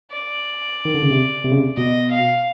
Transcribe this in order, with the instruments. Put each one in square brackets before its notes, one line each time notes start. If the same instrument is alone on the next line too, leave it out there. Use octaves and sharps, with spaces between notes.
[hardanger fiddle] D5
[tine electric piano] D#3
D3
C#3
C3
C3
C#3
C3
[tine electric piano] B2 [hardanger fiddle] D#5
[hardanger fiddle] F5